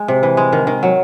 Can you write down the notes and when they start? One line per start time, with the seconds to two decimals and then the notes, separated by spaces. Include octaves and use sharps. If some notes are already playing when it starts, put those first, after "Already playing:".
Already playing: G#3
0.08 C3
0.23 E3
0.37 G#3
0.53 D#3
0.67 D#3
0.83 F#3